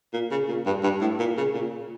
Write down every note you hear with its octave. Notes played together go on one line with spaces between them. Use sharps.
A#2
C#3
A#2
G2
G2
A2
A#2
C#3
A#2